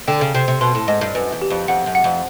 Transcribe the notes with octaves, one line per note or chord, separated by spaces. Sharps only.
D3 G5
C#3
C3 G5
C3
B2 C6
A2
G#2 D#5
G2
F#2 B4
E2
G4
F2
F2 F#5
F#2
F#5
F2